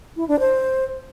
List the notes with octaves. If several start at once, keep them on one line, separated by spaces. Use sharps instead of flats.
E4
D4
C5